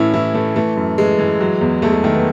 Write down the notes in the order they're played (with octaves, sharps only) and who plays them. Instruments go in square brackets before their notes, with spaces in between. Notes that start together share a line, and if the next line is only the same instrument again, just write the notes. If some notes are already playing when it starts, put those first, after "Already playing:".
Already playing: [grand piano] A2 E3 C#4 E4
E3 E4
E3 A3
E3 A3
F#2
E3 G#3
E3
F#3
E2
E2 A3
G#3
D#3 A3
B3